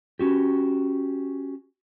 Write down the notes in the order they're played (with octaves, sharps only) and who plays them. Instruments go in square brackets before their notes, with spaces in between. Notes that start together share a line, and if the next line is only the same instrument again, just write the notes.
[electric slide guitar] C#4 F#4 G4